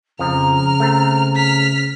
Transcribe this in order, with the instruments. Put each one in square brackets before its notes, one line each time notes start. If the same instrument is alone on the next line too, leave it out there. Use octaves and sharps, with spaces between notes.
[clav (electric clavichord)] F2 F3 [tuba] C#3 [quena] A#5 [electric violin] F6
[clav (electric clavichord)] A3 C4
[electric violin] F6 B6